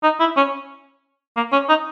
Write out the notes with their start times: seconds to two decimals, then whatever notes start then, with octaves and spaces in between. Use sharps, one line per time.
0.03 D#4
0.20 E4
0.37 C#4
1.37 A#3
1.52 C#4
1.69 D#4